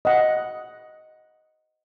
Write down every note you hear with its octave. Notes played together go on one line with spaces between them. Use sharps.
D#5 F#5